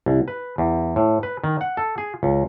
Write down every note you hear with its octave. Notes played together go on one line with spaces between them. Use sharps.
C2
B4
E2
A2
B4
D#3
F#5
A4
G#4
C#2